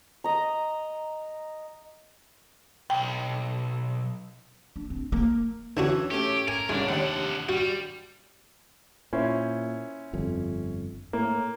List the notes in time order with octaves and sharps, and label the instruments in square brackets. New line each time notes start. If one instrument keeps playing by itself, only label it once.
[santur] D#5 A#5
[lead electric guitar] B1 [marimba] G5
[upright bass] D4
C4
A#3
[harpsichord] D3 D4 F#4 [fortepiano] E3 F#3 C#4
[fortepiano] A3 C#4 [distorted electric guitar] G4
[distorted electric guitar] A#4 [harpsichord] G#5
[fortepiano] C2 C#3 [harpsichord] G#3 [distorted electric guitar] D4
[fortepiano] D#2 D4 [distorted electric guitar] C3 F#5
[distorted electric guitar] G3 [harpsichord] F#4
[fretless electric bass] A#2 [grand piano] C#4 E4 C5
[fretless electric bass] G1 F2
[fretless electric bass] A2 [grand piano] A#3